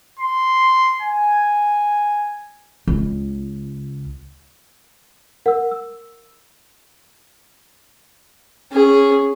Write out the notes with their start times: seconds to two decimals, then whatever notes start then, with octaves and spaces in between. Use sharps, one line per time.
0.19 C6
1.02 G#5
2.87 C#2
5.46 A#4 F#5 E6
5.71 E6
8.72 C#4 G#4